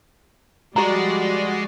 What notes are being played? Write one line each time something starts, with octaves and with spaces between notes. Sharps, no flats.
F3 G3 G#3 F#4 G4 D5 A#5